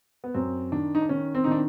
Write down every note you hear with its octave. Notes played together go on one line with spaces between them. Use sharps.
B3
F#2 C4
D#3 D4
D#4
D4
D#3 C#4
C4
D#4
D#3 D4